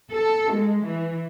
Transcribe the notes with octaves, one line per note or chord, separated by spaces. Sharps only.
A4
G#3
E3